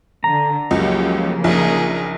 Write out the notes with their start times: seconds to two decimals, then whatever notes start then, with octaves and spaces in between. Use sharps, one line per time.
0.24 D3 A#5
0.71 C#2 F#2 C#3 F3 A#3 G4
1.44 A#1 D#4 G#4 A#4